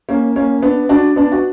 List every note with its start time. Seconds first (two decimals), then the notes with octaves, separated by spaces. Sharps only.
0.09 A#3 C#4
0.36 A#3 C#4
0.62 B3 D4
0.89 D4 F#4
1.16 B3 D4
1.32 F#4